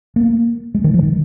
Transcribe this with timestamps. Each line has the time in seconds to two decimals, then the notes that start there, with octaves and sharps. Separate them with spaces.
0.16 A#3
0.75 G#3
0.84 D#3
0.94 F3
1.03 D#3